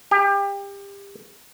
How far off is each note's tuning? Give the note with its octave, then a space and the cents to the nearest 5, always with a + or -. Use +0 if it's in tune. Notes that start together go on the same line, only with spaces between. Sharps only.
G4 +30